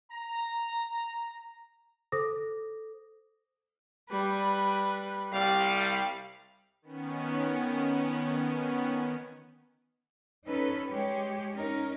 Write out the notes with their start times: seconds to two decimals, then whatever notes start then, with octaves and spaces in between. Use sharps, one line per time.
0.11 A#5
2.12 A4 C5 D6 D#6 A#6
4.10 G3 B4
5.33 C2 G3 F5
6.82 D#3 B3 C#4
10.46 C#4 D#4 A4 B4
10.87 G#3 G4 C#5
11.55 C#4 D#4 A#4